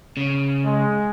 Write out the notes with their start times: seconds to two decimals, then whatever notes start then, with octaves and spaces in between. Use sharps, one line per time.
0.17 C#3
0.65 G#3